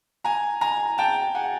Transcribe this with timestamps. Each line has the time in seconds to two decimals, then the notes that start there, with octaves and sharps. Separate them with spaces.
0.24 G#5 A#5
0.61 G#5 A#5
0.98 G5 A5
1.35 F#5 G#5